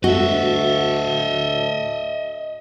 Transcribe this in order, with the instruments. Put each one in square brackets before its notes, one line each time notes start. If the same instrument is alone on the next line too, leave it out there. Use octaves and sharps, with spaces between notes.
[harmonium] D2 A4 [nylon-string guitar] F#4 [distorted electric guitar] D#5 E5